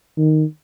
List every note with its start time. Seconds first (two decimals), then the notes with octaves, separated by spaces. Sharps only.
0.17 D#3